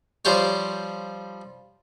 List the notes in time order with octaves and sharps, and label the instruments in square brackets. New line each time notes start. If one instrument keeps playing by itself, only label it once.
[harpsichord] F3 G3 G4 C5 C#5